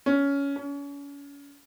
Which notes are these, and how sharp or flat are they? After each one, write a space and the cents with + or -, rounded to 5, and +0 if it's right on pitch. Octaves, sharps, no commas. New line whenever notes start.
C#4 +15
C#4 +35